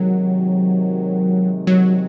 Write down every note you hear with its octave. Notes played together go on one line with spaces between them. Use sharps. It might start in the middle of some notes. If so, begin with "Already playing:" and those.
Already playing: C3 D#3 F#3 G#3
F#3